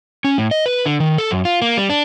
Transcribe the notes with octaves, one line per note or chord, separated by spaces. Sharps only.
C#4
A2
D#5
B4
D3
D#3
A4
F#2
F4
A#3
G3
D4